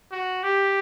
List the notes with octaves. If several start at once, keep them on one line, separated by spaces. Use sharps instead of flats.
F#4
G4